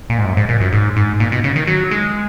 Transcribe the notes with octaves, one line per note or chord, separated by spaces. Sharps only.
A#2
G#2
F#2
G#2
A#2
F#2
G#2
G#2
A#2
B2
C#3
D#3
F#3
G#3